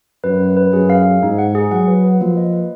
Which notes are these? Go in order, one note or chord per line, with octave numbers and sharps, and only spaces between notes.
F#2 B4
B4
B4
F#2 G#4
F5
G#4
G#2 D#4
F#5
G#4
F#3 F#5
B4
B4
F3 A#3
D#5
B4